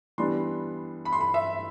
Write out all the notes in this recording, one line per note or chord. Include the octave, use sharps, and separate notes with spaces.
E3 G3 B3 D4 C6
B5
C6
B5
E5